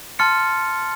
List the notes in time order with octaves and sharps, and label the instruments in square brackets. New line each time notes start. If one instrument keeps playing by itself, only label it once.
[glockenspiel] A5 C6 F6 A6 C#7